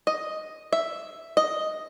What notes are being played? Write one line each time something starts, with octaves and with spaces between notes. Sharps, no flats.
D#5
E5
D#5